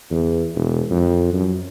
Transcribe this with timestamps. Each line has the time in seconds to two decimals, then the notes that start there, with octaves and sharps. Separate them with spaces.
0.11 E2
0.55 E1
0.91 F2
1.33 F#2